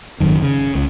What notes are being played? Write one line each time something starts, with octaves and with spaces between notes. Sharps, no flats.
G#1 F#2 D#3
C#3
C#2